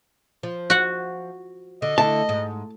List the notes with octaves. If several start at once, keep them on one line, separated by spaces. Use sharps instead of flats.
F3
F#4 F#5
D3 D#5
D3 A3 E4 A5
G#2